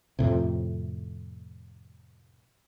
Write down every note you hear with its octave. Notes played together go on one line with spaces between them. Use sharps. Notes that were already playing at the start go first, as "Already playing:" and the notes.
F2 A2 C3